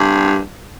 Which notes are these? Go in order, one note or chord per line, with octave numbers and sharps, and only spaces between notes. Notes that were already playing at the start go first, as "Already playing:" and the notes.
Already playing: G2